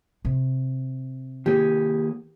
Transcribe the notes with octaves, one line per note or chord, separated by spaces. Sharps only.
C3
D#3 A#3 G4 G#4